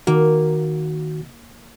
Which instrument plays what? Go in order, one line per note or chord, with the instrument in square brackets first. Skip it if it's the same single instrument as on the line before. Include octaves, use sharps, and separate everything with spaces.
[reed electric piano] D#3 F#4 [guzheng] A#3